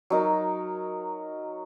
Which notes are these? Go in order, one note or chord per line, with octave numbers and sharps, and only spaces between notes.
F#3 D#4 A#4